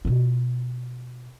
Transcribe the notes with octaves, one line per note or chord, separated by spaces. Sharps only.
B2 F4